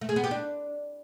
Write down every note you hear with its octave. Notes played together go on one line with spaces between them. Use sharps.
A3
G#4
B3
G4
D4